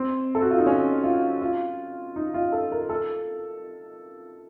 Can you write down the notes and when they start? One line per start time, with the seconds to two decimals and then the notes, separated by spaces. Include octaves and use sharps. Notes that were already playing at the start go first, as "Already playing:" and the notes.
Already playing: C4
0.35 A4
0.42 F#4
0.51 F4
0.58 D#4
0.66 C#4
1.04 F4
1.42 F4
2.16 D#4
2.34 F4
2.52 A4
2.72 A#4
2.89 A4